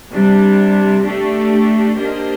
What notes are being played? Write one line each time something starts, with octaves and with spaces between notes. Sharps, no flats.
C3 G3 D4
A3 D4 G4
A#3 D4 G4 C5 D#5